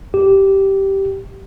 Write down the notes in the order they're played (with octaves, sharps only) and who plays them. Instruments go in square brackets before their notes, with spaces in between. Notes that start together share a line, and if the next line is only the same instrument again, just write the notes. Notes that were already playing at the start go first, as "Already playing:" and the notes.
[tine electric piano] G4